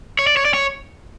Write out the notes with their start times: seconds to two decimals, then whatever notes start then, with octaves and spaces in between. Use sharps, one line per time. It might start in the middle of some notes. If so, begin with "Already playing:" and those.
0.19 C#5
0.27 D5
0.37 C#5
0.45 D5
0.54 C#5